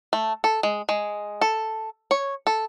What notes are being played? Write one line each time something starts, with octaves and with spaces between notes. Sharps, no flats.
A3
A4
G#3
G#3
A4
C#5
A4